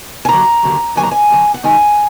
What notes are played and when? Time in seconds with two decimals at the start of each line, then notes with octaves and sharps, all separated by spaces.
0.25 G#5
0.29 D#2 D3 F#3 A#5
0.63 D#2 D3 F#3
0.96 D#2 D3 F#3 G#5
1.03 A#5
1.11 G#5
1.30 D#2 D3 F#3
1.54 F#5
1.63 F#2 D#3 G#3 D#4 G#5